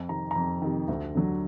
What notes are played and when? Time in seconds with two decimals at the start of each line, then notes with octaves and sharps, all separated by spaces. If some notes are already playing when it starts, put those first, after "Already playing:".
Already playing: F2
0.09 C3 D#3 A#5
0.31 F2 A#5
0.62 C3 D#3
0.88 D2
1.15 D3 F#3